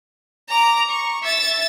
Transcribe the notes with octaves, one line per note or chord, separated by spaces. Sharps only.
A#5 D6
C#6
E5 A6